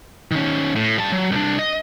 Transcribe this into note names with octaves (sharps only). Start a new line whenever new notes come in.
D#3 C#4
A2
G3 A5
F#3
C2 D4
D#5